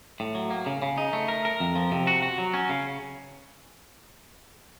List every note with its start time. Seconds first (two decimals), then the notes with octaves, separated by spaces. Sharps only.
0.20 A2
0.35 F#3
0.51 A#3
0.66 C#3
0.82 C#3
0.98 D#4
1.13 A3
1.28 A#4
1.45 A#4
1.60 F2
1.75 F3
1.91 C3
2.07 F#4
2.22 F#4
2.38 F#3
2.54 C#4
2.69 C#3